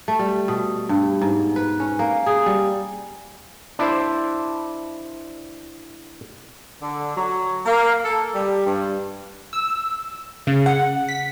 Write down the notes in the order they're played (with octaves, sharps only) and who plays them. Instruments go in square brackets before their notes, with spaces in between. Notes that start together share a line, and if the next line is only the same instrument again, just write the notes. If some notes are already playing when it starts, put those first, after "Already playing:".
[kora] A3
G3
B2
G2
G#2
B4
C#4
A#3
G#4
G3
[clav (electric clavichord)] D4 E4 C5
[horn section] D3
F#3
A#3
A4
G3
G2
[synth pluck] E6
C#3
F#5
B6